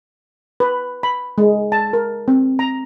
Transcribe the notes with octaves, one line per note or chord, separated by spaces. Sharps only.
B4
B5
G#3
A5
A#4
C4
A#5